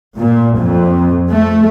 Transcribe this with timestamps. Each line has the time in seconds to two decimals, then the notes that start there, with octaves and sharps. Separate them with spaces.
0.17 A#2
0.59 F2
1.30 A3